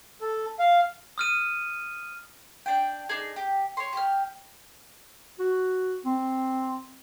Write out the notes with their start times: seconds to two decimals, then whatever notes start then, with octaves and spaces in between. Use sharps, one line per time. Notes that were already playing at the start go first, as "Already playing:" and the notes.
0.21 A4
0.59 F5
1.18 D#6 F6 D#7
2.66 D4 G5
3.09 D4 D#4 G#4
3.36 G4
3.77 C#5 C6
3.93 G4 F6
5.39 F#4
6.05 C4